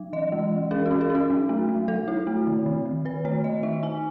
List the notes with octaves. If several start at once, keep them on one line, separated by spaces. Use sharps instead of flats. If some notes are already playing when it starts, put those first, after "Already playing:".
Already playing: F#3
E3 D#5
G#3
E3
C#4 G#4
F#4
C#4
G#4
C#4
F#4
F#3
A3
F#3
F#3 A4
E4
A3
D#3
D#3
D#3
D#3 B4
A3 C#5
D#3 D#5
D#4 E5
D#4 G#5